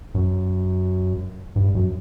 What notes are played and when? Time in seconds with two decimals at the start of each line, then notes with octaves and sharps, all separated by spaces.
0.15 F#2
1.56 G2
1.75 F#2